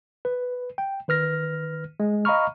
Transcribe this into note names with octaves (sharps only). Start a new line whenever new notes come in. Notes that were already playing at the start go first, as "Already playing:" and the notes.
B4
G5
D#3 B4 F6 A#6
G#3
D#5 F5 A#5 B5 C#6 F6